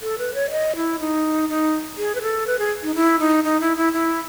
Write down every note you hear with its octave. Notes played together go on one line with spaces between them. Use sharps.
A4
B4
C#5
D#5
E4
D#4
D#4
G#4
B4
A4
B4
G#4
D#4
E4
D#4
D#4
E4
E4
E4